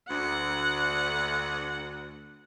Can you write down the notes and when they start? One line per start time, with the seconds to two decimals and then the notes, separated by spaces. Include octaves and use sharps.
0.11 D2 F#5